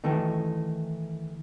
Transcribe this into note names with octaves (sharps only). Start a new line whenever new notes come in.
D#3 E3 A3 D#4